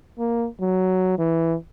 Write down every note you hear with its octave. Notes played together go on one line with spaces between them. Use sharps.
A#3
F#3
E3